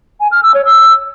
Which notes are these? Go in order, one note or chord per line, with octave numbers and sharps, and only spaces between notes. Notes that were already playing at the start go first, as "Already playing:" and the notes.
G#5
F6
E6
C#5
E6